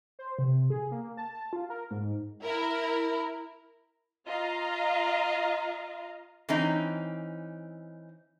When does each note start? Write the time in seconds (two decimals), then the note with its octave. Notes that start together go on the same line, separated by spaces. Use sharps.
0.19 C5
0.39 C3
0.70 G#4
0.92 A#3
1.17 A5
1.53 F4
1.70 A#4
1.91 G#2
2.43 E4 A#4
4.27 F4 D#5 F5 A#5
6.49 E3 C4 C#4 D#4